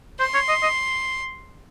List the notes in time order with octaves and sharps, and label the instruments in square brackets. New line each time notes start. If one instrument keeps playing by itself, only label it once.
[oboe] C5 [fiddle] C6
[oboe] C#5
D#5
D#5